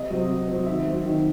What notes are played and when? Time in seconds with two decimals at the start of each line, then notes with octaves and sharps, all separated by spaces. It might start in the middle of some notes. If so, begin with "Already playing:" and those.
Already playing: C3 D#5
0.10 F#3 C4
0.29 C3
0.48 F#3 C4
0.66 D#3 E5
0.85 F#3 C4
1.05 D#3